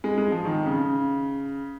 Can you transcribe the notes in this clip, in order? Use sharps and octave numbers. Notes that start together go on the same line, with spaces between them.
G#3
G#3
F3
D#3
C#3